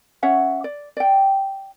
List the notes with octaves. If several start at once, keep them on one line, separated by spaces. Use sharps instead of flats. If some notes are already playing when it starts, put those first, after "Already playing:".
C#4 C#5 E5 F#5
D5
D5 G5